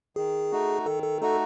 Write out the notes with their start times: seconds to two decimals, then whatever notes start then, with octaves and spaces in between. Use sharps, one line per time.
0.16 D#3 G#4
0.52 A3 D#4 F#4
0.86 D#3 A4
1.03 A4
1.21 A3 D#4 F#4 A4